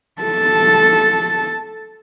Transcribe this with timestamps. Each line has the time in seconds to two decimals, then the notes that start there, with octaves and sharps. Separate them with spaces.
0.22 A4 A5